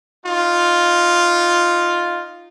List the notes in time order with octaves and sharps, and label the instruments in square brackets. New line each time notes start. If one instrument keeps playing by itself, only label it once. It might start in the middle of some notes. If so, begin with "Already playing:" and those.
[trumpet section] D#4 F4